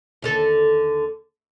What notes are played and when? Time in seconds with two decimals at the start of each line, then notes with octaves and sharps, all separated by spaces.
0.22 D#2 D3 A4